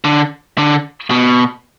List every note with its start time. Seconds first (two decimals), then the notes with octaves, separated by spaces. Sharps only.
0.04 D3
0.58 D3
1.11 B2